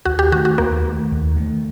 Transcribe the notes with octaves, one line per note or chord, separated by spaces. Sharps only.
D#2 F#4
G4
D#3 A3 F#4
F#4
D#2 A#3
D#3 A3
D#2
D#3 A3